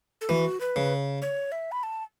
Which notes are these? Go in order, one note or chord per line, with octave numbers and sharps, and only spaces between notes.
A4
E3 F#4
B4
C#3
C#5
E5
B5
A5